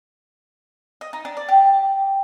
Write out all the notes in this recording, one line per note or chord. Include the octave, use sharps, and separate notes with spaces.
D#5
D#4
D4
D5
G4